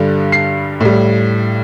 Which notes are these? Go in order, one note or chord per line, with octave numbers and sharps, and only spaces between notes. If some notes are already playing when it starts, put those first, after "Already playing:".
Already playing: G2 D3 G3
C7
A2 G3